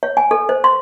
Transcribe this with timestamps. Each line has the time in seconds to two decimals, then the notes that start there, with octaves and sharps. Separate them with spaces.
0.03 C#5
0.17 G#5
0.31 A4
0.49 C5
0.64 C6